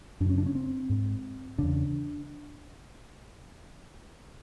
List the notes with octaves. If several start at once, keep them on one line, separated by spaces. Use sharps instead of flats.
F#2 C#3 C#4 D4
D4
C#4
C4
G#2
E2 C#3 D4